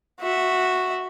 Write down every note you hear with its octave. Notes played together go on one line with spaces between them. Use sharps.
F#4 E5